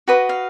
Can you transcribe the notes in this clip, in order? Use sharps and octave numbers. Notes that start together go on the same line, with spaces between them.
F#4 B4 D#5
F5